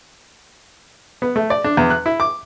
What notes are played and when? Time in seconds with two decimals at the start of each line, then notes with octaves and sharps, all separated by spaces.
1.22 B3
1.36 A3
1.50 D5
1.64 D4
1.77 E2
1.90 F#6
2.06 E4
2.20 D6